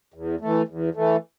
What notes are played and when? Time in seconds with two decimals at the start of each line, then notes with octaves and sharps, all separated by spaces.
0.14 E2
0.41 E3 A3
0.68 E2
0.95 E3 A3